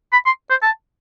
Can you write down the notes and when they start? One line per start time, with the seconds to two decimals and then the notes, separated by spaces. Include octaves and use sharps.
0.13 B5
0.26 C6
0.50 C5
0.63 A5